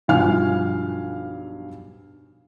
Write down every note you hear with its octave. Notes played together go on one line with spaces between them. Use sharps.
B1 G2 F3 F5 G#5 F6